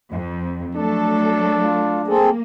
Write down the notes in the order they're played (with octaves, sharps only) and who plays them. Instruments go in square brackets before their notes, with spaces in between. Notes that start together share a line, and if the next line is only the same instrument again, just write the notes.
[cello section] F2
[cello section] F#3 A3 A4 [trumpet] D4
[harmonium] F4
[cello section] A#3 [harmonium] C4 G#4 A4